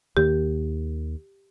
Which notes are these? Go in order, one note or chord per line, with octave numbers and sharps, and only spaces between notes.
D#2 D#3 A#3 G4